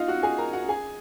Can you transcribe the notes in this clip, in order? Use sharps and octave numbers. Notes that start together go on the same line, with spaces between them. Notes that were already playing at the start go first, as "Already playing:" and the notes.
Already playing: D#4 F4 D#5 F5
F#4 F#5
G#4 G#5
A#4 A#5
F#4 F#5
G#4 G#5